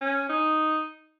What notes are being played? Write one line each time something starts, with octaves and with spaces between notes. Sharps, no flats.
C#4
D#4